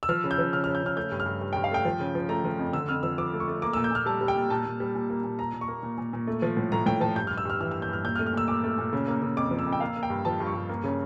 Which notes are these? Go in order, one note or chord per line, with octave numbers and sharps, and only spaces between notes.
E6
F3 F6
C#3
G6
F3
C#3 F6
C#3 F6
G6
C#3 F6
A3 G6
G2
F6
G2
G2
G2 G5
F5
A3 G5
F3
C#3
F3
A3 A#5
F3
F2
D3 E6
F2 F6
F3 E6
F3 D6
A3
C#6
A3
A#3 D6
A#2 E6
G6
A#2 F6
G3 A5
G3
G5
A#2
A#2 A5
A#2
G3
A#2
A#3
A#2
A#2 A#5
A#2
C#6
A#3
A#2
A#2
A#2
A3
F3
A2
A2 A#5
A2 G5
F3 A5
G2 G6
G2 F6
E6
G2 F6
E3 F6
A#3 E6
G6
G2 F6
A#2 G6
F6
A3
F6
A#2 E6
A#2 D6
A3
A#2
C#3
A#3
C#3
F2 D6
F3
E6
F2
G5
A#3 F5
A#3
G5
G2
F3 A5
G2
C#6
G2
A#3
C#3